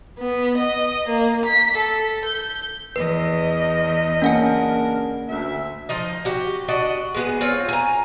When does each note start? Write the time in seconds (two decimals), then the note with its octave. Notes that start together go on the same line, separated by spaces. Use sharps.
0.19 B3
0.57 D#5
1.08 A#3
1.45 B6
1.77 A4
2.25 G6
2.96 E2 B4 D#5
4.22 C#3 A#3 C#4 D4 A#4 F#5 G#5
5.28 D2 E5
5.89 F3 D#4 D#5
6.25 F#4 G4
6.68 D4 F#4 D#5
7.15 G#3 B3 G#4
7.41 C4 F4 C#5
7.69 G#5 A#5